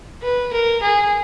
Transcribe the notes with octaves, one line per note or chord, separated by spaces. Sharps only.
B4
A#4
G#4